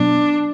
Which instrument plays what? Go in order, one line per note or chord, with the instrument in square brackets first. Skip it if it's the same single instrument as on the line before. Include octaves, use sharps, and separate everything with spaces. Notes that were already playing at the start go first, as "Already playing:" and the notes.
Already playing: [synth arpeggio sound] B2 F#3 B3 [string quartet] D4